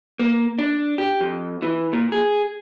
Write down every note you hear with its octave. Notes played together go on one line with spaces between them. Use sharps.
A#3
D4
G4
F2
E3
A#2
G#4